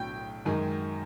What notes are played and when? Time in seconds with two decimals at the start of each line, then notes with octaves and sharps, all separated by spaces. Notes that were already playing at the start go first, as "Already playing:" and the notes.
Already playing: B1 A2 F#3 D4 G5 G6
0.45 F#2 D#3 G#3